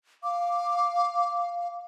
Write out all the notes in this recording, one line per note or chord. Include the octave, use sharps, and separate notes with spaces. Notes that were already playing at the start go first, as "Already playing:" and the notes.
F5 D6